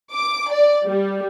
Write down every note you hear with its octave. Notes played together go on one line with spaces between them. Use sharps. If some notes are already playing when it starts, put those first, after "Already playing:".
D6
D5
G3